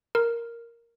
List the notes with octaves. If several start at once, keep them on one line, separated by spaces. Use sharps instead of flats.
A#4